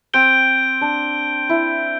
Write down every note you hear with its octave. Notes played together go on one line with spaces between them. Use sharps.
C4 G6 D7 G7
D4
E4